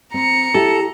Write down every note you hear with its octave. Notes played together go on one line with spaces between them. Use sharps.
C4 A#5 C#7
E4 G4 A4